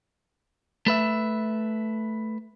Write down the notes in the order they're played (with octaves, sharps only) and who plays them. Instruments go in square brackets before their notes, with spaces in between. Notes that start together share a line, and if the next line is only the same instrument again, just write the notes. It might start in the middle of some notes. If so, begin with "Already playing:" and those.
[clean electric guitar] A3 B4 E5